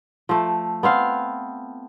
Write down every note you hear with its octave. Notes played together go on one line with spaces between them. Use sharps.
F3 A3
B3 C4 F5